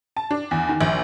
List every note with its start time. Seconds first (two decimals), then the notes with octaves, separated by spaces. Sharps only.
0.17 A5
0.31 D4
0.51 E2
0.69 D#3
0.81 A#1